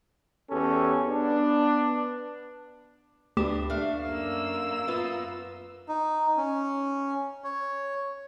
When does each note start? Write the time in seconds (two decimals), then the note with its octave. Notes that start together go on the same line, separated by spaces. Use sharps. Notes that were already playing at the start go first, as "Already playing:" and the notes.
0.50 E2 B3 C#4 G4 A4
1.07 B3 D4
3.37 D2 B3 D4 G4 E7
3.70 A3 D4 F5
4.06 F#2 A#3 E6
4.88 B3 F4
5.89 D#4
6.37 C#4
7.44 C#5